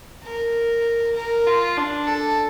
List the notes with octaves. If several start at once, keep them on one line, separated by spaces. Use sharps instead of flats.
A#4
A#4
F4
D4
A4